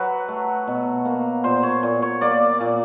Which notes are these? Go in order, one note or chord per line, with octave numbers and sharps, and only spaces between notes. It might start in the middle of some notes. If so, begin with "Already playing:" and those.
Already playing: F#3 B4
A3
B2
A#3
A#2 C5
C#5
A#2
C#5
A#3 D5
A#2